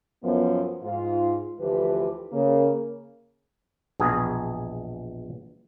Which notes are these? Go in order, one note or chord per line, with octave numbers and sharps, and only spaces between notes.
F#2 F3 B3
G#2 F4
D2 E3 F3 G4 B4
C#3 A#3
A#1 E2 B2 G#4